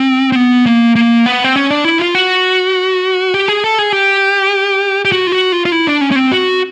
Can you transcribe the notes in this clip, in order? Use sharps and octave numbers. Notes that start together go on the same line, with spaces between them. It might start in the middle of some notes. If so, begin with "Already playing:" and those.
Already playing: C4
C4
B3
A#3
A#3
B3
C4
C#4
D4
E4
F4
F#4
G4
G#4
A4
G#4
G4
G4
F#4
F4
F#4
F4
F4
E4
D4
C#4
C#4
C4
F#4